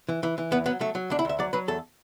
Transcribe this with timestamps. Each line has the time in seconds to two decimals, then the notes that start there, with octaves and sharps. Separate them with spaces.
0.09 E3
0.23 E3
0.38 E3
0.51 E2 B3
0.66 F#3 B3
0.80 F#3 A3
0.95 F#3
1.10 D2 D4
1.19 E4
1.25 D2 E5
1.39 F#3 D5
1.53 F#3 B4
1.68 E2 A4